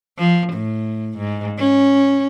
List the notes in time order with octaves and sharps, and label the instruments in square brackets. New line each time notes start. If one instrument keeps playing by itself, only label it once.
[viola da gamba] F3
A2
G#2
C#4